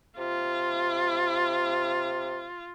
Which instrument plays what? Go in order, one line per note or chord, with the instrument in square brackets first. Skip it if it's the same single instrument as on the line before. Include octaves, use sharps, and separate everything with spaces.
[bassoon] C3 [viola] F4